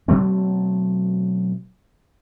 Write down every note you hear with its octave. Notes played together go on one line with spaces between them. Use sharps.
B2 F#3 A3 C4